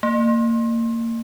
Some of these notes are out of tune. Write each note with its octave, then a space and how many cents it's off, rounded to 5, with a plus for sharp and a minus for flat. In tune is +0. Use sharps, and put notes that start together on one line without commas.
A#3 -25